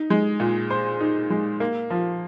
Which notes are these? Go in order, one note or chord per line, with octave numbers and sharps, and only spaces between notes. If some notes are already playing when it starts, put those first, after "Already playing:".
Already playing: D#4
G#3
A#2
C5
D#4
G#3
A#3
F3